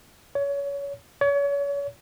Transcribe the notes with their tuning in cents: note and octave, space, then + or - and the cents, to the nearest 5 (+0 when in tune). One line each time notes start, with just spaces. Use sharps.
C#5 +25
C#5 +35